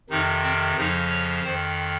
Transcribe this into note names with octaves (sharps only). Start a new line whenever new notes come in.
F2 C3 D#3 D#4
C4
F2 C#3 F3 D#4
C#5
F2 D#3 C5